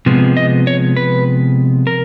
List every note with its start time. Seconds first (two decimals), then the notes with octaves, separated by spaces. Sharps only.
0.06 C3 F3 G#3 B3
0.37 D#5
0.67 C#5
0.96 B4
1.87 A#4